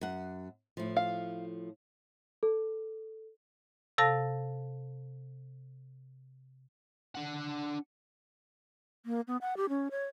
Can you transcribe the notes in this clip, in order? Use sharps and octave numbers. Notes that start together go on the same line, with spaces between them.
F#2 F#5
A2 F3
F5
A4
C3 A4 F5 A5 A#6
D4 F#5
A#3
B3
F#5
G4
C#4
C#5